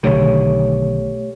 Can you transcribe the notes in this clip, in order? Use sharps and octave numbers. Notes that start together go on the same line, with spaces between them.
B1 D3 D#3 A3 G4 C#5